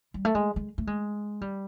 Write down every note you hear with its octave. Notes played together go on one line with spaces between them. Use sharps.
G3
A3
G#3
G#3
A3
G#3
G3